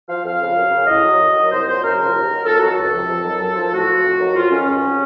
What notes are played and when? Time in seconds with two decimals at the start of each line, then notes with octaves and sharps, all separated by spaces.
0.09 F3 F5
0.24 F2 F5
0.41 C#3 F3
0.56 F#2
0.71 C#3 F#3
0.87 A2 D#5
1.03 F#3
1.19 F#2
1.35 D#3 F#3
1.50 C2 C5
1.66 A#2 F#3 C5
1.82 F#2 A#4
1.98 C#3 F3
2.14 D#2
2.30 D#3 F#3
2.46 F2 A4
2.59 D#3 F#3 F#4
2.71 A4
2.77 C#2
2.93 C3 F3
3.08 F2
3.24 D#3 F#3
3.40 F#2
3.55 F3
3.72 A2 F#4
3.87 F3
4.03 F2
4.19 D#3 F#3
4.35 F2 F4
4.50 D#3 F#3 C#4
4.67 C#2
4.82 C3 F#3